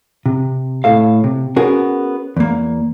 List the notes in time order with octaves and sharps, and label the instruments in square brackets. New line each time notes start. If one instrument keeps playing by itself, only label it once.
[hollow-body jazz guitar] C3
A2 A4 F5
C3
B3 C#4 F#4 G#4 A#4
E2 A#3